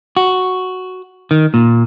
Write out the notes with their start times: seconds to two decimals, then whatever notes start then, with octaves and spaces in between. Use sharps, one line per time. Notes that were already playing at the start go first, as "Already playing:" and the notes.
0.17 F#4
1.31 D#3
1.54 A#2